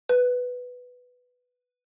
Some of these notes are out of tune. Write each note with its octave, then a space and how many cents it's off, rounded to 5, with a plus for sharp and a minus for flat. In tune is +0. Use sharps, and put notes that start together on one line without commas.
B4 +5